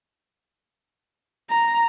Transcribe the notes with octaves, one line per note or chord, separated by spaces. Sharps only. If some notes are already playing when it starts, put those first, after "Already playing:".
A#5